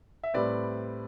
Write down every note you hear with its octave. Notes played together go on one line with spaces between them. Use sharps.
E5
A2 G3 C4 B4 D5